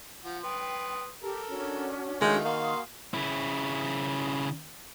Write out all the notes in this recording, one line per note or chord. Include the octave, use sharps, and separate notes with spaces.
F3 F#5
B4 G5 C6 D#6
G4 A4 A#4
C#4 D4 F#4
D#3 G#3 A3 F4 G#4
A#3 F#4 F5 G#5 C6 D#6
C#3 E4